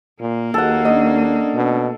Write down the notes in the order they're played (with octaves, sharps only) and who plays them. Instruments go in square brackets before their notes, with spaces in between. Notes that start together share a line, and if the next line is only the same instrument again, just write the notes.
[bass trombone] A#2 [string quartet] A#3
[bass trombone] D#2 [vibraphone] F#4 G#4 D#5 [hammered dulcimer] A4 F#5
[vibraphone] C#4 D4 D5 [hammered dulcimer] D#5
[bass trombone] B2